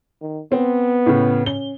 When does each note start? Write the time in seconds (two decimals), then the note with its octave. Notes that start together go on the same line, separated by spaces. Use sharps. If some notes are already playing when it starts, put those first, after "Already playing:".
0.21 D#3
0.52 B3 C4
1.06 A2 C#3
1.46 C#4 G7